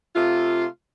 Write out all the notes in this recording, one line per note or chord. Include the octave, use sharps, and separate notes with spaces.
C3 A3 F4